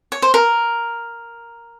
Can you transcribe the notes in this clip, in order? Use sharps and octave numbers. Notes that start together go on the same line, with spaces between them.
C#5
C5
A#4